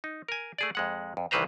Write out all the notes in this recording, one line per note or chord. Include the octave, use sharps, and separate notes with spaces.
D#4
A#4 G#5
A3 G#4 D5
F2 G#3 F#5
F2
C2 D#3 E3 B4 C5 A#5